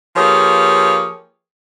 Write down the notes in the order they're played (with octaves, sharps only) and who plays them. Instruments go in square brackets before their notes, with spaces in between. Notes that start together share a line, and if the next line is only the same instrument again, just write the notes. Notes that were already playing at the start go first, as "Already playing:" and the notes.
[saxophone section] F3 A#3 G4 G#4 B4 C#5